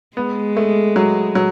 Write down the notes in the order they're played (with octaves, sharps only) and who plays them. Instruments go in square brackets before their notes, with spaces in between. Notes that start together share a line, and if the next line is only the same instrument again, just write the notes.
[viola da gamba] G#3 [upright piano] B3
[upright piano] A3
F#3
F#3